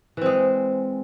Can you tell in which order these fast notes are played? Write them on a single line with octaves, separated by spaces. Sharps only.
E3 C4 G#3